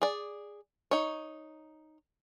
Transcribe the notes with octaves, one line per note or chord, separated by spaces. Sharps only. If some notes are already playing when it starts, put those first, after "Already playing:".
G#4 D5
D#4 C#5